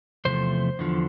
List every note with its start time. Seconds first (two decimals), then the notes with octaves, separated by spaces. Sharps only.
0.25 E2 C3 F3 A3 C5
0.79 E2 D3 F3